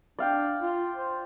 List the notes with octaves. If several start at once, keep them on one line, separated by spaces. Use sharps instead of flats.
D4 D5 F5 G5
F4
C5